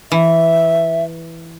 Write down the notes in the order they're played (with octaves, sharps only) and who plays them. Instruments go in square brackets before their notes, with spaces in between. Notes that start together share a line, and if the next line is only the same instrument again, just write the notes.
[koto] E3 [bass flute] E5